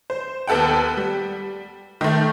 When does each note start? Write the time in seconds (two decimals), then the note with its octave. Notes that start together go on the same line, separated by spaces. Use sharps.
0.10 C5
0.47 D#2 B3 A4 F#5 G5
0.97 G3
2.01 D#3 A3